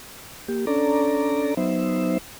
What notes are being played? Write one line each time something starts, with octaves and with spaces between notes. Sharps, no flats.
A#3 G4
C#4 D4 A4 D5 A#5
F#3 B3 D#4 C5 E5